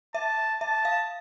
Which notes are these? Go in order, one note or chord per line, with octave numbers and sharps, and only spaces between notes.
E5 A5
E5 A5
F5